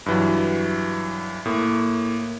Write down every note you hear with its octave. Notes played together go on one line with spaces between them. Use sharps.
G2 E3 F#3
A2 A#3